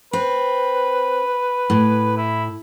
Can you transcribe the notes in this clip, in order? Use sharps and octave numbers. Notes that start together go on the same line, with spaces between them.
C4 B4
A2
E4